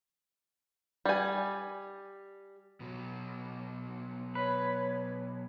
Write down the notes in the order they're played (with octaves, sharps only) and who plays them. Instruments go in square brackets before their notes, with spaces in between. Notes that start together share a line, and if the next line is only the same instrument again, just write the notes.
[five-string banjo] G3 G#5
[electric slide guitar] B2 F#3
[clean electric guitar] B4 [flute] C#5